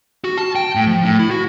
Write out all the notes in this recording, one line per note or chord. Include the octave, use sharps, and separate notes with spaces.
F#4
A5
G5
A2
F3
A2
E4
F#4